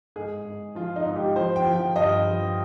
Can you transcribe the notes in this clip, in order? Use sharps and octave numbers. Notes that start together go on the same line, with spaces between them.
G#2 G#4
G#2
F3 F4
D#4
G#2
G4
F3 C5
G5
F3
G5
G2 D#5
F3